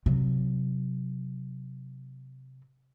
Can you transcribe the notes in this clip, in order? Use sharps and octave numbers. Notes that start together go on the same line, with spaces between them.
C3 F#3